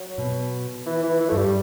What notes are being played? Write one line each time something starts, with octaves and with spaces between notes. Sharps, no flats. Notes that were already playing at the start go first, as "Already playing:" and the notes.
Already playing: F#3
B2
E3
E3
E3
G2 A3
G3